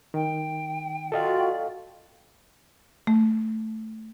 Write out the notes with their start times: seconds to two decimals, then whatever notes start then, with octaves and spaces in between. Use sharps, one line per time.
0.14 D#3 G5
1.12 F4 F#4 A4 D5 D#5 F5 G5
3.07 A3